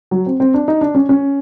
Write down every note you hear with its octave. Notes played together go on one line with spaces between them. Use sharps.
F#3
C4
C4
D4
D#4
D4
C#4
C#4